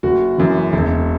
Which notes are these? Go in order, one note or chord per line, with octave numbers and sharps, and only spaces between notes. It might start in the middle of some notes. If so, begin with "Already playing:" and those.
F#1 F#4
F#2 E3
E1